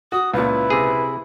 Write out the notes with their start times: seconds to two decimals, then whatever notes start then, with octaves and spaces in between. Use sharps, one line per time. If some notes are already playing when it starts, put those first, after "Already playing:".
0.12 F#4 D#6
0.34 C#2 A#2 E4 B4
0.70 C3 G#4